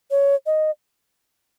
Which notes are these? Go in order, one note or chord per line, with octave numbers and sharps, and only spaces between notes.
C#5
D#5